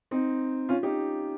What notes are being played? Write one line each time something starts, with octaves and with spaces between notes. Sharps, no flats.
C4 D#4
C#4 F4
D#4 G4